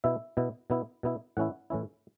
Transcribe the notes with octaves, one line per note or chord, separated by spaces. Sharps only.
B2 B3 E4 E5
B2 B3 E4
B2 B3 E4
B2 B3 E4
A2 E3 C#4 E4 F#5
A2 E3 C#4 E4